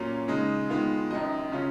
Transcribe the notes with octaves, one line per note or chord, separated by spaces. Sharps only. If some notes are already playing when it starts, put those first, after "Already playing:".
Already playing: A#2 F#3 A#3 C#4 F4
C#3 G#3 D#4
D#3 G#3 B3 F4
F#2 D#3 F#3 D#5
C#3 F#3 C#4 F4